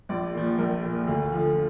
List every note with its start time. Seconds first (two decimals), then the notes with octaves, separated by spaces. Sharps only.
0.09 A#1 D5
0.34 A#2 F3
0.58 A#1 A#4
0.83 A#2 F3
1.07 D2
1.32 D3 F3